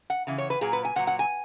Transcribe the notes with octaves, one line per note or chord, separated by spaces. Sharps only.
F#5
C#3 E3
C#5
B4
A#2 F#3 G#4
B4
G#5
A#2 F#3 F#5
F#5
G#5